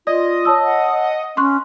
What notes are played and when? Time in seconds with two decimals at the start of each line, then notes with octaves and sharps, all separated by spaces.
0.07 F4 D5 D#5
0.45 C#5 A5 E6
0.64 F#5
1.37 C#4 C6 C#6 F#6